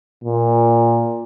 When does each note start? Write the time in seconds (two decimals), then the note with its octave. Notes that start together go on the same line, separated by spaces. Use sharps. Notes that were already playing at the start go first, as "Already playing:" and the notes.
0.24 A#2